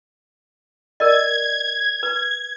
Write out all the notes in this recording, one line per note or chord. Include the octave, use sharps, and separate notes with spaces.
A#4 D5 D#5 G#6
B4